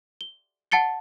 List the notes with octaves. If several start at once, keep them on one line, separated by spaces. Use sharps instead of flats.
G7
F#5 A5 A6 C#7 G7